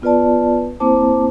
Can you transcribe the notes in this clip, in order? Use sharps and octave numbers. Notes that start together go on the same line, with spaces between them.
B3 F4 B4 D5 A5
A#3 C4 E4 C5 A5 D6